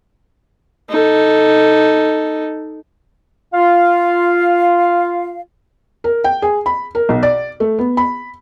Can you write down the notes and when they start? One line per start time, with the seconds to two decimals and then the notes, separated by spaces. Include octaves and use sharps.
0.89 D#4 A4
3.54 F4 F5
6.04 A#4
6.24 G5
6.42 G#4
6.66 B5
6.95 A#4
7.09 B1
7.23 D5
7.60 A3
7.79 B3
7.97 B5